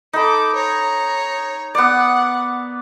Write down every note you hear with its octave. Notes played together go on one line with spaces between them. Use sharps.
D#4 A4 B5 D6
C#5 A#5
B3 D5 F#5